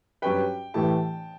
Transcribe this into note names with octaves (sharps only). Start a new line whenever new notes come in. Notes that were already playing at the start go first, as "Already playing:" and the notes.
G2 F#3 C#4 G4 B4 G5
A2 E3 A3 E4 G4 A5